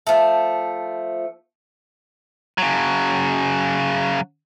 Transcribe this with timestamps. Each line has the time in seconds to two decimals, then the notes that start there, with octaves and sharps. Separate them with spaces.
0.07 F3 A3
2.58 C#3 F#3